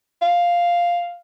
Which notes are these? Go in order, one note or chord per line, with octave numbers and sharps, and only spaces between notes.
F5